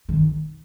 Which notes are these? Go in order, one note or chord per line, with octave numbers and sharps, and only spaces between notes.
D#3